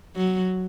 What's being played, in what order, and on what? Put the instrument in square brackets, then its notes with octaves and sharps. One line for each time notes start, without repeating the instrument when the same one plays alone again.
[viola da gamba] F#3